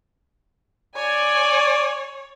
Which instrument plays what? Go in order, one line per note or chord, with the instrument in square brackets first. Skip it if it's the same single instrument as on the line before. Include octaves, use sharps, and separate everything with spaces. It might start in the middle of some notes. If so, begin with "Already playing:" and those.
[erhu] C#5 [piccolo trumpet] D5 [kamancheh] G#5